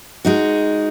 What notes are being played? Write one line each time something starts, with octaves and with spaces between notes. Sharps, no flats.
G#3 D#4 F#4